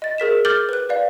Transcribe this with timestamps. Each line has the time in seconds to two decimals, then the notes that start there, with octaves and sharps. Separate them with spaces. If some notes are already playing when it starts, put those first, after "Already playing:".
0.02 D#5 A6
0.18 G#4 A#4 B6 E7
0.45 D6 F6 G6 A6 F#7 G7
0.69 B4 F#6
0.89 B4 D5 F5